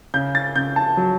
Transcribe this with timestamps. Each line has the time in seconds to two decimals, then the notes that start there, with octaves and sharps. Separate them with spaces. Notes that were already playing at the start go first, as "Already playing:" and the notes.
0.14 C#3 G6
0.35 A6
0.56 C#3 G6
0.76 A5
0.97 F#3